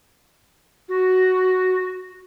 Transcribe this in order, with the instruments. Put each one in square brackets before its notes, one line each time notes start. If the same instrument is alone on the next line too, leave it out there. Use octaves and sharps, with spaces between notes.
[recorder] F#4